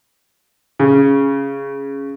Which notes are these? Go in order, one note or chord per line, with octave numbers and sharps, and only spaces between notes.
C#3